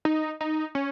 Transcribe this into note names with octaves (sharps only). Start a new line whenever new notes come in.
D#4
D#4
C#4